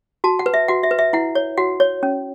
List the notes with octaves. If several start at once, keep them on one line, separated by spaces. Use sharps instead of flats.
F#4 A5
F#5
B4
E5
F#4 F#5
E5
B4
E5
E4 F#5
C#5
F#4 F#5
C#5
C#4